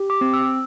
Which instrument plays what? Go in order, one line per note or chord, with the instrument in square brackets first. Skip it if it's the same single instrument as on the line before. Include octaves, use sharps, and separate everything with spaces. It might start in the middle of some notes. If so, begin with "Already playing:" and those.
Already playing: [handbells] G4
D6
C4
E6